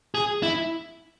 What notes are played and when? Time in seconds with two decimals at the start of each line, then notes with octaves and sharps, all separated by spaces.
0.15 G#4
0.43 E4